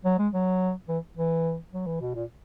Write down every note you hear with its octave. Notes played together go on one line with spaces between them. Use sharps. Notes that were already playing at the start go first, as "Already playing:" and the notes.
F#3
G#3
F#3
E3
E3
F#3
E3
B2
A#2